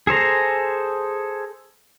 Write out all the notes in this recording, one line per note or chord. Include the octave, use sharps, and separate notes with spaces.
G#4 A4 C5 A#5